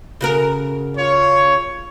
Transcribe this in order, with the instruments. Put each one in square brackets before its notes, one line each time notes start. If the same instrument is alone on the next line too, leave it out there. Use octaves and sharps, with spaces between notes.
[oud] C#3 F#4 A#4
[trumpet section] F4 C#5